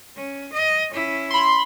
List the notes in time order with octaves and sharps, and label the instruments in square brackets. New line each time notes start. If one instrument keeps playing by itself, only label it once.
[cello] C#4
D#5
C#4 E4
[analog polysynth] B5 C6